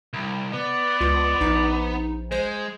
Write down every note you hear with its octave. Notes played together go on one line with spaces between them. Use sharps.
C2
B3 D5
C#2 F4
A#1 D#4
G#3 C5 G#5